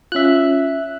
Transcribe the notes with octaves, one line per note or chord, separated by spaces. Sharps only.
C#4 F4 E5 F#6